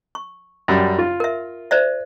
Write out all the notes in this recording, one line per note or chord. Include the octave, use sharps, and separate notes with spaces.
C#6
F#2 G3
F4
A#4 E5
C5 D5 E5